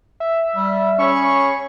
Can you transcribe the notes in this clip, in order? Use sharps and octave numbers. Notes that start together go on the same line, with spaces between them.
E5
G3
C#4 G#4 C#5 B5 C#6